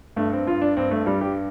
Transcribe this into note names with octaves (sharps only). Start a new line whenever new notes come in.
G2 A3
C4
G2 F4
D4
G2 C4
A3
G2 G3
G4